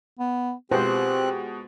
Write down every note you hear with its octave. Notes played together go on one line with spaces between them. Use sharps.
B3
B2 G#3 C4 F4 G4 B4 C5 F#6